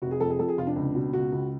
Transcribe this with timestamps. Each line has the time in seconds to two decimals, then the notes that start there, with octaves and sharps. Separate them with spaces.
0.02 F1 F#4
0.11 G#4
0.20 F2 A4
0.30 G#4
0.39 F2 A4
0.48 G#4
0.57 F1 F4
0.67 D4
0.76 C#2
0.95 B2
1.13 C#2 F#4
1.32 C#2